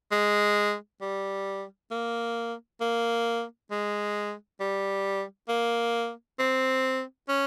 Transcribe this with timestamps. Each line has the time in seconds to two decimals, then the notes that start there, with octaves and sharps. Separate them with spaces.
0.12 G#3
1.01 G3
1.91 A#3
2.80 A#3
3.71 G#3
4.60 G3
5.49 A#3
6.39 C4
7.29 C#4